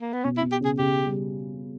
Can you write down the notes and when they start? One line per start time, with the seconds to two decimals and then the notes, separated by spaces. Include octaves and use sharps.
0.01 A#3
0.13 B3
0.24 B2 C#4
0.37 E4
0.42 B2
0.52 G4
0.61 C#3 G#4
0.79 C#3 G4
1.06 G3